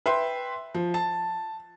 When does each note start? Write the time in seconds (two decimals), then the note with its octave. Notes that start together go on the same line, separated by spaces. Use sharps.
0.06 B4 E5 G5 C6
0.74 F3
0.94 A5